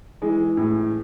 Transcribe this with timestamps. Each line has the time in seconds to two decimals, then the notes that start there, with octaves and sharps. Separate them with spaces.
0.22 E3 G#3
0.57 A2